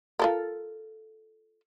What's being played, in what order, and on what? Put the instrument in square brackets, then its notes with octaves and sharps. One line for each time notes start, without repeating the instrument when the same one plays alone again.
[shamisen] F4 A4 A#4